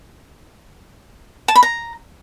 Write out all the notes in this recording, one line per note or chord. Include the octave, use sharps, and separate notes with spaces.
A5
B5
A#5